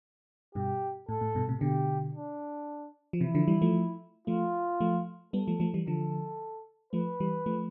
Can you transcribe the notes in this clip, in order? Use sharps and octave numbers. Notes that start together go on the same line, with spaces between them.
G2 B2 G4
A2 A4
A2
G2 B2
A2 C3
B2 D3 G4
D4
F3
C3 E3 E4
D3 F3
E3 G3
F3 A3
F3 A3 F4
F3 A3
G3 B3 A4
F3 A3
F3 A3
E3 G3
D3 F3 A4
F3 A3 B4
E3 G3
F3 A3